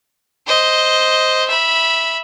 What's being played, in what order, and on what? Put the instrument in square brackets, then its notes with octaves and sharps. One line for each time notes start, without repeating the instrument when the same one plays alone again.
[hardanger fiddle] C5 D#5
E5 B5